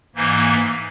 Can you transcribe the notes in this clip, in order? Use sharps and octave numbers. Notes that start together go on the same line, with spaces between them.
G#2 E3 A#3 D#4